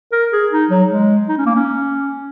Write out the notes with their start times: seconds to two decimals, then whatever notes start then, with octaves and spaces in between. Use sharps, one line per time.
0.12 A#4
0.33 G#4
0.52 D#4
0.70 F#3
0.89 G#3
1.29 D#4
1.38 C#4
1.46 A#3
1.55 C#4